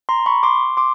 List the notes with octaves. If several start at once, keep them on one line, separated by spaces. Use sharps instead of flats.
A#5 C6
B5 C#6
C6 D6
C6 D6